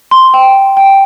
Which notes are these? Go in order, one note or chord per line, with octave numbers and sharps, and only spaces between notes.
C6
G5
G5